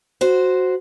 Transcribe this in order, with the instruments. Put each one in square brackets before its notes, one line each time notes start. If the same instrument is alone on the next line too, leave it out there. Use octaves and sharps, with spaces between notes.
[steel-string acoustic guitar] F#4 C5